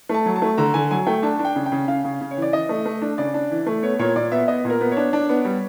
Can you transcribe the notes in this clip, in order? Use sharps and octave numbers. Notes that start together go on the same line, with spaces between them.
A3 A5
F#3
A5
A3
D3 A#5
D3 G#5
F#3 G#5
A3 G5
D4 A5
D4
G5
C#3
G5
C#3
C#3 F5
C#3
C#3
C#5
E3
D5
E3 D#5
A3
A3
D4
C#3 D5
D4
E3
A3
B3 C#5
A#2 C#5
A#2 D5
B3 E5
B3 D#5
A#2
A#4
B3
C#5
D4
D4
B3
G3